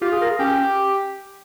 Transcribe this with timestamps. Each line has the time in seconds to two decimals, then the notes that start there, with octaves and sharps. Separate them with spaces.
0.01 F4 G4
0.12 G#4
0.21 A#4
0.30 G#4
0.39 C#4 G4